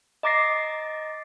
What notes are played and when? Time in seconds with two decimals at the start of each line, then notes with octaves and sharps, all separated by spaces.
0.23 D#5 A#5 D6 A6 A#6 C7